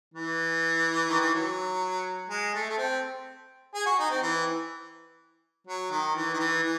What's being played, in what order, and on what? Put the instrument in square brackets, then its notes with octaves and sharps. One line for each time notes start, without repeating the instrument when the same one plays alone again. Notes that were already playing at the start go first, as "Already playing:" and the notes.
[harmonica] E3
D#3
E3
F#3
G#3
A3
A3
C4
G#4
F#4
D#4
C4
E3
F#3
D#3
E3
D#3
E3
E3